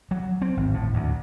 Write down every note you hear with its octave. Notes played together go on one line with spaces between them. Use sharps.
F#3
C4
G#1
A2
D2